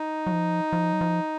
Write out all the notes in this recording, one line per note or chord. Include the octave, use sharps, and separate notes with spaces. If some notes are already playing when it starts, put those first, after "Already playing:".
Already playing: D#4
F#3
F3
F3
F#3
F3